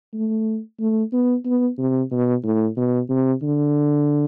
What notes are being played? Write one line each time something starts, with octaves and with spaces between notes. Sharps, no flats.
A3
A3
B3
B3
C3
B2
A2
B2
C3
D3